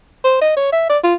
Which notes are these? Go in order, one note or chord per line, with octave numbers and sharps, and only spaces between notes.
C5
D#5
C#5
E5
D5
F4